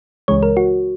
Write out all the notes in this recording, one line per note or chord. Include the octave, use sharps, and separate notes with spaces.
C#2 C#3 E3 G#3 C#5
A#4
F#4